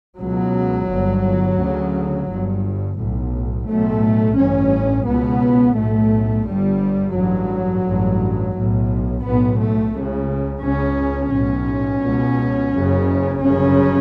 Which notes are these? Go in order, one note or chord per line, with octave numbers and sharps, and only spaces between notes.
C#2 B2 F#3
G1 G2
D2 C#3
G1 G2
B1 A2
B1 A2 A3
A1 G2 C#4
C#2 B2 B3
B1 A2 A3
G1 G2 G3
A1 G2 F#3
A1 G2
B1 A2
B1 A2 B3
A3
C#2 C#3
C#2 C#3 C#4
B1 A2 C#4
C#2 B2
F#1 F#2 C#3
G1 F#2 C#3 C#4